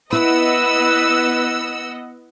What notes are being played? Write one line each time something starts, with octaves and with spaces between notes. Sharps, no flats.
B3 E4 B4 D#5 F#5 E6